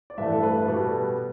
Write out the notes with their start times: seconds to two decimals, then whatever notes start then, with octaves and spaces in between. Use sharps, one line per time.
0.10 D5
0.18 G2 E3 A3 E5
0.32 A4
0.43 B4
0.68 B2 G3 B3 A4